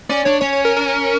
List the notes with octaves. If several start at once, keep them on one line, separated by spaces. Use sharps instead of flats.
C#4 D5
D4 C#5
C#4 C#5
C#5
A#4
A#4